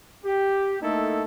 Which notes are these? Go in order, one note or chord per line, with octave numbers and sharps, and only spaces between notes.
G4
A3 A#3 D#4 E4 A4